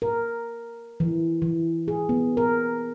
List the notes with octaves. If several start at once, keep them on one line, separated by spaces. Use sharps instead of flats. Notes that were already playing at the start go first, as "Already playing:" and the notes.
A#4
E3
E3
G#4
B3
A#4